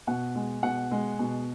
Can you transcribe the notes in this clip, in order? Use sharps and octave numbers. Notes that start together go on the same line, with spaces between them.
B2 F#5
G#3
B2 F#5
G#3
B2